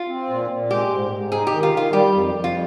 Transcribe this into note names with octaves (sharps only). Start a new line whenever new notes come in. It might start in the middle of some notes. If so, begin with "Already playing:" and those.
Already playing: F4
C4
A#2
A#2
G#3 G4
G#2
G#2
D#4 G#4
G4
D#3
F4
D#3 F4
G3 G4
F2
F2
F4